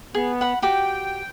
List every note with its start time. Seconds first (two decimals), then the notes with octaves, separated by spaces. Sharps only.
0.15 B3 G#4
0.41 F#5 B5
0.62 F#4 G4 G5 D6